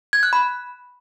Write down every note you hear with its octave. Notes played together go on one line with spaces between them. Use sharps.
G#6
F#6
B5